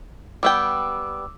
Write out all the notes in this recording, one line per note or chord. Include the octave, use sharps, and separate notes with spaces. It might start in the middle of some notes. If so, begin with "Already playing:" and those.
G3 B3 G5 D6 E6